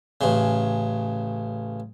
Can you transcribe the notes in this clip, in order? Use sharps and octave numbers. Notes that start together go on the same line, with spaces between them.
A1 C#3